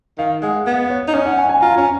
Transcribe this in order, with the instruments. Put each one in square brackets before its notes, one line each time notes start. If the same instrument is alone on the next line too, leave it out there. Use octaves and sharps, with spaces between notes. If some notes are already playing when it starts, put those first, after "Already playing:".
[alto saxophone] D#3 [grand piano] F5
[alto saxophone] G#3 [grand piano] F#5
[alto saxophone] B3 [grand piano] F#5
[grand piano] C#5
[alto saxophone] D#4
[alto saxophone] C#4 [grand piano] D#5
[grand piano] F#5
G#5
G#5
[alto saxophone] F4 [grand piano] A#5
[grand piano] G#5
[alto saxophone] C#4